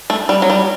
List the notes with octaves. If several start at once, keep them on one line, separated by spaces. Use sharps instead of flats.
A3
G3
F#3
G3